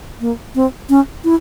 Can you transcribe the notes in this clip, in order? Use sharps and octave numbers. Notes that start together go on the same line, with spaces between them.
A#3
C4
C#4
E4